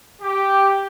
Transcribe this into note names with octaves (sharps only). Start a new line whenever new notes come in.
G4